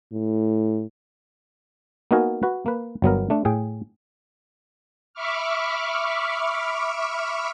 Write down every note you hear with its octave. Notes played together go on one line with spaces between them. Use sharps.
A2
A#3 B3 D#4 F#4 A#4 G#5
F#4 B4
A#3 B4
G1 F#3 B3 A#4
A3 D4
A2 G#4 G5
E5 B5 C#6 D6 F6